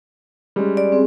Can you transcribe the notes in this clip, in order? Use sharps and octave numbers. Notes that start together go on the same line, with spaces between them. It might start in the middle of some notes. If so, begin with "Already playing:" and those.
G3 G#3 C#4
D5
C4 G#4